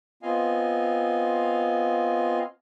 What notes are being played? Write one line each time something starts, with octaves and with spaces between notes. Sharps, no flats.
B3 C4 F4 D#5 F5 G#5